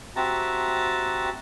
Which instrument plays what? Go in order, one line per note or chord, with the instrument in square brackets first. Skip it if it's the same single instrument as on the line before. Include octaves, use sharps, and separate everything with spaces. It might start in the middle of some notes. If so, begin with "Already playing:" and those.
[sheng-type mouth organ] C4 F#4 G4 E5 A5 A#5